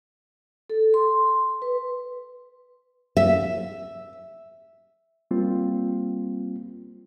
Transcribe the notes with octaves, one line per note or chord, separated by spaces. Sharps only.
A4
C6
B4
E5
G3 A#3 C4 F4